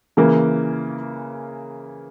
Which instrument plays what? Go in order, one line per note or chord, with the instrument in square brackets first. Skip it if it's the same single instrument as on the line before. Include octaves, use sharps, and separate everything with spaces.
[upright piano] C#3 E3 A#3